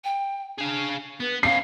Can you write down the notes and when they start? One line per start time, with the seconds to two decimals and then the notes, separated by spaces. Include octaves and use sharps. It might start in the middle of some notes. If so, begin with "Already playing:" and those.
0.04 G5
0.58 D4 G#4 F5
1.20 B3 B4
1.43 B3 C#4 F5 C7